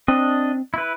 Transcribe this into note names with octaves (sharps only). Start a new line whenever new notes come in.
C4 D4 D#5
E4 B4